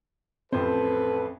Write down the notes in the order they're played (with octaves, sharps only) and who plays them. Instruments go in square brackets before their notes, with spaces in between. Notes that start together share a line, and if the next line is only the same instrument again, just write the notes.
[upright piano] A1 F2 C5 [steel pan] C4 [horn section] A4 B4